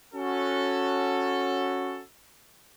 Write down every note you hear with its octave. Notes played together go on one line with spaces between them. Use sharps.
C#4 F#4 A4